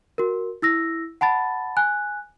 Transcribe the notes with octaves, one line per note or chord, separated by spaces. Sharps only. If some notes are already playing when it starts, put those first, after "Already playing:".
F#4 A#4
E4 E6 A#6
F#5 A5 B5 A6
G#5 F#6